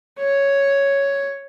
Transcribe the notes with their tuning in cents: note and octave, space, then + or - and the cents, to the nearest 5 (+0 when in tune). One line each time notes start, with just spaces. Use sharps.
C#5 +5